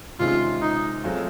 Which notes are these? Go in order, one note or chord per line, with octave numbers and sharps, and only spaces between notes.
C3 D#3 G#3 C#4 F4
D#4
F#3 A3 C4 F4 G#4